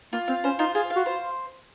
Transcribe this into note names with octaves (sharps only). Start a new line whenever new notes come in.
A#3 F4
C4 F5
C#4 C5
D#4 F4
F4 G#4
F5
F#4
C5